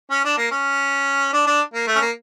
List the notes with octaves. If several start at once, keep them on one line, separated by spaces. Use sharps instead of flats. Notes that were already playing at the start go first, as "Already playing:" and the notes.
C#4
D4
A#3
C#4
D4
D4
A#3
A3
C#4
A#3